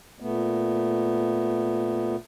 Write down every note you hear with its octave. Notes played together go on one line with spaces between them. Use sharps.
A#2 A3 B3